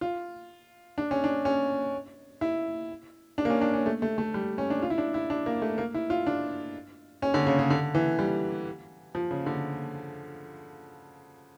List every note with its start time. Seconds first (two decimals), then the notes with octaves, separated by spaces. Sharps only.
0.01 F4
0.98 D4
1.11 C#4
1.24 D4
1.45 C#4
2.41 E4
3.38 D4
3.45 A#3
3.50 C#4
3.61 D4
3.74 C#4
3.86 A3
4.02 A3
4.18 A3
4.34 G3
4.58 C#4
4.70 D4
4.82 F4
4.90 E4
4.98 D4
5.14 E4
5.30 D4
5.46 A#3
5.62 A3
5.78 A#3
5.94 E4
6.10 F4
6.27 D4
7.22 C#4
7.34 D3
7.46 C#3
7.59 C#3
7.70 D3
7.95 E3
8.19 G3
9.15 F3
9.31 C#3
9.46 D3